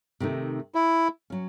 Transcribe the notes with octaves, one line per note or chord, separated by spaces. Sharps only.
C3 D#3 A3 D#4
E4
F#3 C#4